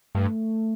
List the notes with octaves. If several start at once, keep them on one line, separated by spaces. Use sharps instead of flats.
G2 A3